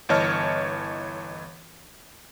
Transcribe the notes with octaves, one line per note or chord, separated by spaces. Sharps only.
G1 E3 C#5 D#5 A5 F6